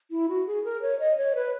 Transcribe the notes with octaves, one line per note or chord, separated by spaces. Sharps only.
E4
F#4
G#4
A#4
C#5
D#5
C#5
B4